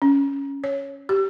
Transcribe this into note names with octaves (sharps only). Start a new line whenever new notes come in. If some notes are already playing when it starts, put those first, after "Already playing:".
C#4
C#5
G4